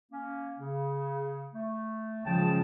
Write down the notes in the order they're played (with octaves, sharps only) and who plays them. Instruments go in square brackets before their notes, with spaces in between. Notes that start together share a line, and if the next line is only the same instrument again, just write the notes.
[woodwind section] A#3 C#4
C#3
A3
[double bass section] C#3 F3 G#3 [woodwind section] G5 A5